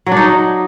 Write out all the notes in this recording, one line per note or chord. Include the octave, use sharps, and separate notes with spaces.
F#3
D4
D#4